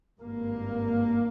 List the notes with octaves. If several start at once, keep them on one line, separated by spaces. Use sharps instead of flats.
G#1 G2 A#3